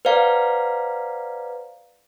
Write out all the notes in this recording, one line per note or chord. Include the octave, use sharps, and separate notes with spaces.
B4 C5 D5 F5 F#5 A#5